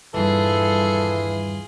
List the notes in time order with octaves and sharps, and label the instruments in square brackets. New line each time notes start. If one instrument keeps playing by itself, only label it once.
[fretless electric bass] D#1 G2 D#3 [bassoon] E3 [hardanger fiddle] F4 G#4 [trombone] A4